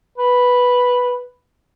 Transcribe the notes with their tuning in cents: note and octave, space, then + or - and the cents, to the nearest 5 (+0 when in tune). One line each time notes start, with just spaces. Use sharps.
B4 -5